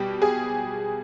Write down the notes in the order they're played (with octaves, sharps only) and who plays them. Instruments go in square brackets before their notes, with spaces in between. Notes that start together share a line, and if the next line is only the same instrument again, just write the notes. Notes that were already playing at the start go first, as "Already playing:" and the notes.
Already playing: [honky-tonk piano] B2 G3 G4
G#4